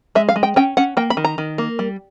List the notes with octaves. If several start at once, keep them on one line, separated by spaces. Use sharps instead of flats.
G#3 E5
F5
G#3
G5
C#4 G5
C#4 F#5
A#3 G5
B5
D#3
A#5
D#3
A#3
G3